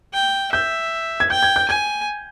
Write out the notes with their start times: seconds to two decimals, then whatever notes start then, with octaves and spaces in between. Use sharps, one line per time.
0.14 G5
0.52 E5 G6
1.20 G#6
1.30 G5 G6
1.43 G#6
1.56 G6
1.69 G#5 G#6